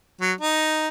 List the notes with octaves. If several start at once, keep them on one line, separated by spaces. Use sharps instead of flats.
F#3
D#4